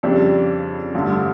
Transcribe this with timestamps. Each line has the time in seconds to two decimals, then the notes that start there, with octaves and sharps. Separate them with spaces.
0.03 F2 C#3 G3 D4 G4
0.95 A1 G2 D3